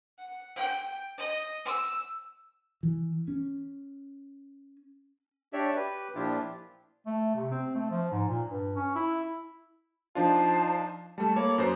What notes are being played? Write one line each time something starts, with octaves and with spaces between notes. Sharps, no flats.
F#5
G5
D#5
E6
E3
C#4
D4 G4 C#5 D5 E5
G4 B4
A#2 F3 D4 E4 F4 G4
A3
C3
C4
A3
F3
G#2
A#2
G2
C#4
E4
F3 D4 D#4 F4 C5 A5
G3 A3 A5
A#3 A4 C#5 B5 D6
F#2 B4 C5 D#6